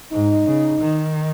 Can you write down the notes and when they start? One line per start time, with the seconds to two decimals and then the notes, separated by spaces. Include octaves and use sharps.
0.11 G#2 D#4
0.46 C#3
0.80 D#3